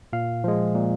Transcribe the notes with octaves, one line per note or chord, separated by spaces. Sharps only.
A#2 F5
F3 G#3
A#2